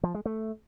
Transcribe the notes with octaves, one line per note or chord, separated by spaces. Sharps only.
F3
G#3
A3